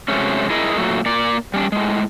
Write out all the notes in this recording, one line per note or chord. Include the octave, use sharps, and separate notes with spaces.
C3 F#3 G#3 A3 C#4
E4 G#4 A#4 D#5
A#2 F#3 A3
A#3 D5
G3 C#4 D4
A2 G#3